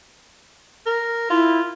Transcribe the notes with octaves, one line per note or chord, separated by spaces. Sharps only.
A#4
E4 F4